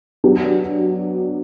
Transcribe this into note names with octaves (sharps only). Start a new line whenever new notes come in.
F#3 B3 D4 G4